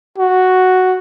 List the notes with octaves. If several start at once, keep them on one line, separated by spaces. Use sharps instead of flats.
F#4